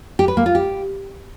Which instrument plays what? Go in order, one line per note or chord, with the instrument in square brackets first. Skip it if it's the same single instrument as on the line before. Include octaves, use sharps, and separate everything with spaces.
[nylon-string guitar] G4
B4
A#3
F4
G4